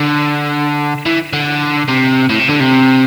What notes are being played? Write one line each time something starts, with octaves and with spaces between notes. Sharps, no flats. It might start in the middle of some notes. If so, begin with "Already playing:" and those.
Already playing: D3
E3
D3
C3
A2
C3
D3
C3